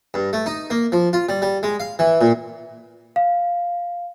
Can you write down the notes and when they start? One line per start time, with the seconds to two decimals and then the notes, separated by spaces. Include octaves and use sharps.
0.14 G2
0.33 A3
0.46 D#4
0.70 A#3
0.92 F3
1.13 F4
1.29 G3
1.42 G3
1.63 G#3
1.80 F5
1.99 E3
2.21 A#2
3.16 F5